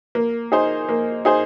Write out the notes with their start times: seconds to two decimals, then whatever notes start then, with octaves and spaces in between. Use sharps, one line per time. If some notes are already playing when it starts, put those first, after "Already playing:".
0.15 A#3
0.52 D#4 G#4 C5
0.89 A#3
1.25 D#4 G#4 C5